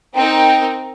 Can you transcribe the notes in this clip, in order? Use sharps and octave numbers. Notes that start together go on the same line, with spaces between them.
C4 D#4 A#4 G5